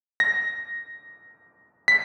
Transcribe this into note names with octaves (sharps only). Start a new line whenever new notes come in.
A#6
B6